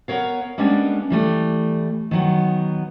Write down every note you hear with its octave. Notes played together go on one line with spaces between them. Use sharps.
B3 A#4 C#5 F5
G3 G#3 A#3 B3 C#4 D4
E3 G3 A3
D#3 F#3 B3